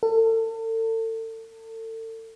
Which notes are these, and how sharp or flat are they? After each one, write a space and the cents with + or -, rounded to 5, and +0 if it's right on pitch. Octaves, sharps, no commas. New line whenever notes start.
A4 +35